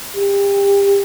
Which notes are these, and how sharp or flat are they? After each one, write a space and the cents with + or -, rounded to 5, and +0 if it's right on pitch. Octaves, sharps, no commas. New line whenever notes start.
G4 +30